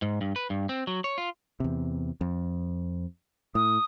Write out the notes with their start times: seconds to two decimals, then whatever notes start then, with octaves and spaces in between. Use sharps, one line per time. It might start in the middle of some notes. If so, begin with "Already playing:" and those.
0.02 G#2
0.21 G2
0.36 B4
0.50 G2
0.69 C4
0.87 F#3
1.04 C#5
1.18 F4
1.60 E2 C3
2.21 F2
3.55 A2 D#6